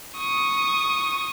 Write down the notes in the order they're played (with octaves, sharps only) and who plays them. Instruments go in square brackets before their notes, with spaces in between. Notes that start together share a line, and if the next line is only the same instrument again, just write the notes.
[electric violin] C#6 D#6